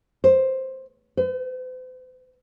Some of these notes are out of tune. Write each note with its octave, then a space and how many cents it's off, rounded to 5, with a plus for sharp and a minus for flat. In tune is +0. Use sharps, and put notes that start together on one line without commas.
C5 +10
C5 -45